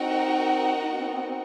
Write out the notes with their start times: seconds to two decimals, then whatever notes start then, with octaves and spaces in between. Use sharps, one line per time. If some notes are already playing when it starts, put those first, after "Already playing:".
Already playing: C4 D#4 F#4 A#4 D#5 F#5
0.90 B3
0.97 C4
1.05 B3
1.12 C4
1.19 B3
1.26 C4